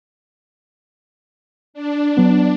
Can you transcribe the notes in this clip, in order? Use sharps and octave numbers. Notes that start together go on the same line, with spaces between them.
D4
F#3 B3